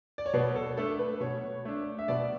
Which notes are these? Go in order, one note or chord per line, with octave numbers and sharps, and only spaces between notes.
D5
C#5
B2 B4
A4
A3 D4 A4
B4
B2 C#5
A3 D4
E5
B2 D5